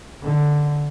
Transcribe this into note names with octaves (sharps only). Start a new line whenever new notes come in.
D3